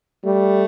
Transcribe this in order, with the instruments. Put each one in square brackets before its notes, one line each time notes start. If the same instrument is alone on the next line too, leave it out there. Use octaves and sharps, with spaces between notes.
[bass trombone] G3 [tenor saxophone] A3